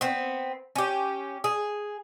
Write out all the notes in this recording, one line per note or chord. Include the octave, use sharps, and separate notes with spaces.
B3 C4
C#4 G4
G#4